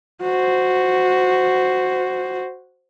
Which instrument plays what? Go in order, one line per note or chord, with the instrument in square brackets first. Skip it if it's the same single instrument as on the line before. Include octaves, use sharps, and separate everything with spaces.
[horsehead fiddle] F#4 C5